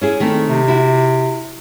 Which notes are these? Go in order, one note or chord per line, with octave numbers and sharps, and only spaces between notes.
C#4 E4 G#4
D#3 A3 C4
C3
E4 F#4